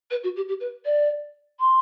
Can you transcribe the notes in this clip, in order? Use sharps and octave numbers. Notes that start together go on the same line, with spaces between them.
B4
F#4
G4
G4
B4
D5
C6